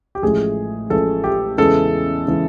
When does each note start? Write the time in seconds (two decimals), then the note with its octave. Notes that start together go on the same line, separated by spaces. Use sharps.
0.15 G4
0.22 A1 A2 F3 G#3 G#4
0.90 A1 A2 F3 G#3 A4
1.24 G4
1.58 E2 C#3 E3 G#3 A4
2.27 C#3 E3 G#3